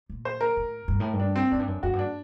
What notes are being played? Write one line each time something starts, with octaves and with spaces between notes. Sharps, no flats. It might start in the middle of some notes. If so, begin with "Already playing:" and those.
A#2
C5
A#4
A2
G2
A2
G2
D4
C4
F#2 D4
G2
F#2
F#2 F#4
G2
D4